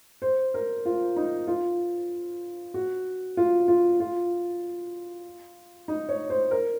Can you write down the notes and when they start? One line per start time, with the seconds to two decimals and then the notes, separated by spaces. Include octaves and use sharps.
0.22 C5
0.54 A#4
0.86 F4
1.16 D#4
1.48 F4
2.74 F#4
3.37 F4
3.68 F4
4.00 F4
5.88 D#4
6.09 C#5
6.30 C5
6.51 A#4